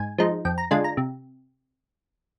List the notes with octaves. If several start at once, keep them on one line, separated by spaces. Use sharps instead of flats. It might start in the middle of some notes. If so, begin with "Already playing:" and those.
Already playing: G#2 G#5
F3 G#3 D#4
F2 G5
A#5
D3 G#3 D4 F4 G#5
A#5
C3